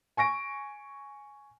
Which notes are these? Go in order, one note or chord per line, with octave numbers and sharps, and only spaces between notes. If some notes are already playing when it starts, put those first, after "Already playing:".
G#5 C#6 A#6 D7